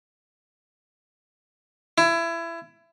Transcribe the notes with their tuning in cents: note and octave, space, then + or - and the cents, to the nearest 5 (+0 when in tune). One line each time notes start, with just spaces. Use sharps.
E4 +25